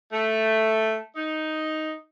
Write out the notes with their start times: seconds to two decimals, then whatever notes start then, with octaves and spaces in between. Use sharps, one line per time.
0.12 A3
1.15 D#4